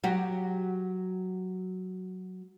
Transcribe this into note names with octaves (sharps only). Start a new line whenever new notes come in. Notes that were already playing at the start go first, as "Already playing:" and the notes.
F#3 F#4 G4